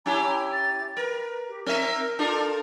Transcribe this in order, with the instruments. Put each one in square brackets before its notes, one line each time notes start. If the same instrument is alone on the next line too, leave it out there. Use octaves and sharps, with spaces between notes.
[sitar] C#4 E4 G4 [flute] A#5
[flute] A6
[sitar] A#4 [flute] B4
[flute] G4
[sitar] C4 E5 [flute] A#4
[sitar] D4 F4 A#4 [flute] A4